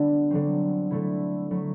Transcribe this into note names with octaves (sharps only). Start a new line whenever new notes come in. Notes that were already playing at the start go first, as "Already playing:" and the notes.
Already playing: D3 G3 B3 D4 E4
D3 F#3 C4
D3 A3 E4
F#3 A3 E4